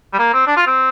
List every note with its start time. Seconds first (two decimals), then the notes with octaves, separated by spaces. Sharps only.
0.13 G3
0.19 A#3
0.33 C4
0.47 D4
0.57 F4
0.67 C4